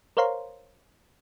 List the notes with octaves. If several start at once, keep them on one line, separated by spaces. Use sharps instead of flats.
A#4 C5 C#5 F5 A#5 C6